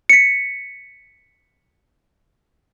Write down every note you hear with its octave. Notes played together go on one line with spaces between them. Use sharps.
B6 C#7